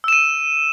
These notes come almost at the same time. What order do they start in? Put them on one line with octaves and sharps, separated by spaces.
E6 E7 D#7